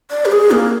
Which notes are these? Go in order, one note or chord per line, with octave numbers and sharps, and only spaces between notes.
D5
G4
G#4
A#3